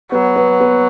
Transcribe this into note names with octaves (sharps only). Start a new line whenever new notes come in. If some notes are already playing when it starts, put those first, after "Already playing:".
F#3 B3
B3
B3